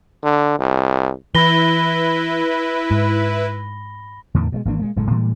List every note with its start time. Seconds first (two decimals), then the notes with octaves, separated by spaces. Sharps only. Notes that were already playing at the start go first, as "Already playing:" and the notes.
0.23 D3
0.59 C2
1.35 E3 E4 B4 B5 A#6 G7
2.91 G#2
4.34 E2 A2 D3 D#3
4.52 B2 F#3 G#3
4.65 G#1 E3 A#3 D4
4.80 A#2 G#3 A#3
4.96 F#1 A2 G#3 A3
5.10 A2 E3 G3 G#3